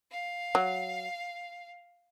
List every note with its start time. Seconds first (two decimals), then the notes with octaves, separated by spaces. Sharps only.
0.11 F5
0.55 F#3